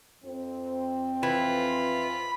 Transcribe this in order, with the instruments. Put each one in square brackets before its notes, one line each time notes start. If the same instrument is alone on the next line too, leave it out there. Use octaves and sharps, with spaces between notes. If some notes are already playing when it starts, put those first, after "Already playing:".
[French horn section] F2 C4
[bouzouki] E3 [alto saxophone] F4 [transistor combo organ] B5